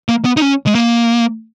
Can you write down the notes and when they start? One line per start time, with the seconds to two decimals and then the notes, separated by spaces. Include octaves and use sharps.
0.09 A#3
0.25 B3
0.37 D#4
0.42 C#4
0.67 G#3
0.75 A#3